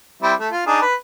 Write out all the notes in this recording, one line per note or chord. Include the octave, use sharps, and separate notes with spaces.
G3 C4 E4
A3
F4
D4 D#4 G#4
B4